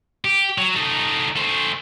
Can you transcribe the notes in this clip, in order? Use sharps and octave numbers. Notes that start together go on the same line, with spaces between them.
G4
F#3
A3 D#4
A3 C5